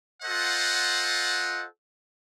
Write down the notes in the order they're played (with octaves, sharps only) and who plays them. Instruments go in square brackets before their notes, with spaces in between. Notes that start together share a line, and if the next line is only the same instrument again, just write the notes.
[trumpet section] F4 A4 C5 D#5 F#5